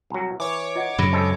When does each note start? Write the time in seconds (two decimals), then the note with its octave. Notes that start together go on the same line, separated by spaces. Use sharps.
0.10 C2 F#3
0.40 E3 C#5 D6
0.76 F4 D#5 F#5
0.98 F#2 C#3 F#3 B5 A#6 D7
1.12 C3 G#3 A4